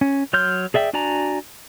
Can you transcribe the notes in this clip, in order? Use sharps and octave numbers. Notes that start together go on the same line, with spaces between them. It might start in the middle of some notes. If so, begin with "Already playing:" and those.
C#4
F#3 C#5 C6 F6 G6
G#4 D5 E5 G5
D4 F#4 D5 G#5 A#5